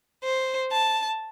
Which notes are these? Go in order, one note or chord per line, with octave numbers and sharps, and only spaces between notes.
C5
A5